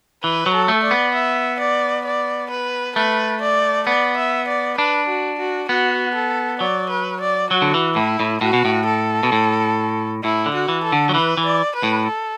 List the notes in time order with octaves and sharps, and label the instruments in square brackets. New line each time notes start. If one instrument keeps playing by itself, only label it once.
[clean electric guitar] E3 [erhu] B4
[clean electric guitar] F#3
[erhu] A4
[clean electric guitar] A3
[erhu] D5
[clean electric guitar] B3
[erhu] E5
D5
D5
B4
[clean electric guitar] A3 [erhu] B4
[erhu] D5
[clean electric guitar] B3 [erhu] D5
[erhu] E5
D5
[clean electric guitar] D4 [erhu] B4
[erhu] F#4
F#4
[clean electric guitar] B3 [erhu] F#4
[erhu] A4
[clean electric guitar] F#3 [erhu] D5
[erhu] B4
D5
[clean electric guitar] F#3 [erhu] F#4
[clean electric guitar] D3
E3
[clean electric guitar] A2 [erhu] E4
[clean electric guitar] A2
[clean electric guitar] A2 [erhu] F#4
[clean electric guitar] B2
A2
[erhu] A4
[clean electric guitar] B2
A2
[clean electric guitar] A2 [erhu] E4
[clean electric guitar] D3
[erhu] F#4
[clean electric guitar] E3
[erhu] A4
[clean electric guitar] D3
F#3
[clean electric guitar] E3 [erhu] B4
[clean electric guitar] E3
[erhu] D5
B4
[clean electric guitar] A2
[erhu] A4